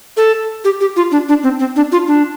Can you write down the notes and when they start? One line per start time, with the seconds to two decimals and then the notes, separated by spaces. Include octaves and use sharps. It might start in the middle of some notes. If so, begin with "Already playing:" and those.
0.17 A4
0.65 G4
0.81 G4
0.96 F4
1.12 D4
1.29 D4
1.43 C4
1.60 C4
1.76 D4
1.92 F4
2.07 D4